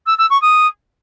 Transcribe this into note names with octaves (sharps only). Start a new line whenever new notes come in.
E6
E6
C#6
D#6